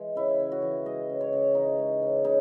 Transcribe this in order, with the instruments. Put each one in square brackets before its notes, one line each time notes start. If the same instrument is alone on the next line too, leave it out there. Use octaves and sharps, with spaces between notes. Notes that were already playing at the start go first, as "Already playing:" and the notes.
Already playing: [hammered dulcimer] E3 G#3
C#3 E4
C#3
F#4
E3
G#3 D#5
C#3
C#5
C#3
E3 D#4
G#3
C#3
C#3 D#4